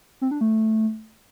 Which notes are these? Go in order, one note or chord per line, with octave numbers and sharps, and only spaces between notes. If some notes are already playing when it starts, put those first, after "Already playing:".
C4
D4
A3